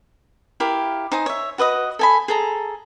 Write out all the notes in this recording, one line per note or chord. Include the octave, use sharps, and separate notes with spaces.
E4 G4 A#4 F5
D#4 C5 G#5 D#6
C#5 E5
F#4 B4 D#5 D#6
A4 G#5 B5
G#4 A4 A#5